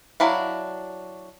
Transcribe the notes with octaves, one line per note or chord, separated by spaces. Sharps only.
F#3 D4 E4 F5